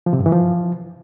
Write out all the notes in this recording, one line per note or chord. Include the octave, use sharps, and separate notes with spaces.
F3
C3
G2
E3
F3